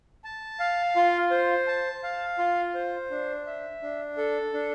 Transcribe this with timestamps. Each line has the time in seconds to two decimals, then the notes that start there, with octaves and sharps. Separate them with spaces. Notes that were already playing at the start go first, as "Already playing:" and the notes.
0.24 A5
0.60 F5
0.96 F4
1.31 C5
1.67 A5
2.03 F5
2.38 F4
2.74 C5
3.11 D4
3.46 E5
3.83 D4
4.17 A4
4.54 D4